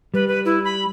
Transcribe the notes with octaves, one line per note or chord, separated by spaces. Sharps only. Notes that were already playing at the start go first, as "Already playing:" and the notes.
G3 B4
B4
E4
B5